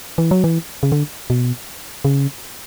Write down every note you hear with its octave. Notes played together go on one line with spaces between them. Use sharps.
E3
F#3
E3
C#3
D3
B2
C#3